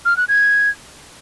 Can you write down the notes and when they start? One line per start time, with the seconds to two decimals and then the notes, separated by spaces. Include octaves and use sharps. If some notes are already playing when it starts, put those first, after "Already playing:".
0.05 F6
0.17 F#6
0.28 G#6